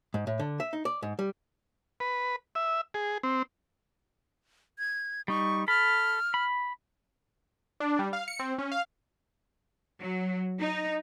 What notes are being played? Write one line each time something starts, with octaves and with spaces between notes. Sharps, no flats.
G#2
A2
D3
E5
D#4
D5
G#2
G3
B4
E5
G#4
C4
G#6
G3 D#4 C#6
A4 B5 F6
B5
D4
G3
F5
C#7
C4
C#4
F5
F#3
D#4